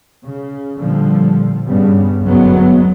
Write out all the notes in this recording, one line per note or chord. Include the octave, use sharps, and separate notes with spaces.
C#3
A#2 D3 F3 G3
G2 C#3 G3 B3
F#1 D2 A2 F#3 G#3 B3